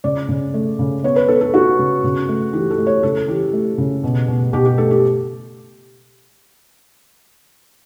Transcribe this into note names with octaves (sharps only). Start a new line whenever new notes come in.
C#3 D5
C#3
A3
C#3
B3 C#5
B4
B3 A4
A4
B3 F#4
C#3
C#3
A3
E3 G4
A4
A3
C#5
C#3 A4
E3 G4
A3
C#3
B2
B2
B2 G4
G4
A3 A4
G4